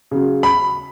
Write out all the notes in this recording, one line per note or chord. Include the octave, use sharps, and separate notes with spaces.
C#3 F#3
B5